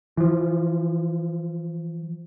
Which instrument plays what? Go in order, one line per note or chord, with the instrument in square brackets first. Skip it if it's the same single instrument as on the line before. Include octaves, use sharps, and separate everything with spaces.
[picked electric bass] E3 F3